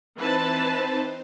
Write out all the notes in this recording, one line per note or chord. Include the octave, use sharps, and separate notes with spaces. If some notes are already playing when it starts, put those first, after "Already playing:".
E3 C4 D#4 B4 C5 A5